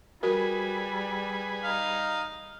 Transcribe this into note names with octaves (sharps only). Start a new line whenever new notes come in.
G3 F#4 G#4 A#4 B4 G#5
D#4 F5